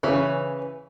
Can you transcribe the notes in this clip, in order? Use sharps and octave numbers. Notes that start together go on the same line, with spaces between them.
C#3 E3 C#4 B4